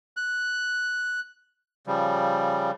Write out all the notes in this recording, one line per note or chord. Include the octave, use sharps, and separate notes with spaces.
F#6
C#3 F3 G3